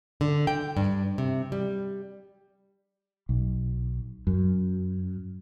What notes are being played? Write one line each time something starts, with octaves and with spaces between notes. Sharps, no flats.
D3
G5
G2
C3
G3
B1
F#2